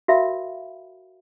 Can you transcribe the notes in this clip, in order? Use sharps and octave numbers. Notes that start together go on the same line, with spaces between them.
F#4 A#4 E5 F5 B5